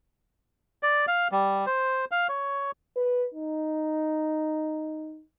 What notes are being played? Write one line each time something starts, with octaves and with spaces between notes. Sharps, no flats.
D5
F5
G3
C5
F5
C#5
B4
D#4